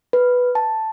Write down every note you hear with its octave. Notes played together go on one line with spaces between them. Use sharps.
B4
A5